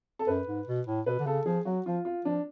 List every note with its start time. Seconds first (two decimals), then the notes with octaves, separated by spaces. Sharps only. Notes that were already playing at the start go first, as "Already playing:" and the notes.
0.19 A4
0.27 F#2 B4
0.47 G#2
0.67 B2
0.87 A2
1.06 B2 B4
1.19 D3
1.26 C#3 A4
1.46 F3 G#4
1.65 F#3 F#4
1.86 F3 F4
2.05 F4
2.25 F3 D4